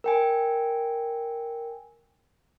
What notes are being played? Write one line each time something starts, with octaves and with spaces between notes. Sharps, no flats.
A#4 G5 G#5